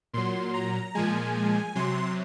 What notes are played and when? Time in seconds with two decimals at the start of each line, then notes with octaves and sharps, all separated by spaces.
0.14 A#2 F#3 C6
0.54 A#5
0.95 A#2 F3 G#3 G#5
1.75 C3 F#3 C6